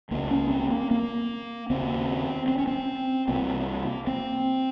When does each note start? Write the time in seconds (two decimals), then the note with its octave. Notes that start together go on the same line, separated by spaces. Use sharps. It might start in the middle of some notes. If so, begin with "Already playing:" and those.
0.11 C#2 C#3 A#3
0.31 C#4
0.51 C4
0.70 A#3
0.91 A#3
1.70 D#2 C#3 C4
2.48 C4
2.58 C#4
2.67 C4
3.28 C2 C3 A#3
4.07 C4